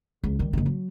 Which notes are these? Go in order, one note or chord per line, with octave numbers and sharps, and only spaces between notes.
C#2
D#3 G3
F#1 D#3
F#3